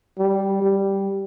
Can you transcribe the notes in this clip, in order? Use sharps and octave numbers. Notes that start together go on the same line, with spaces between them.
G3
G3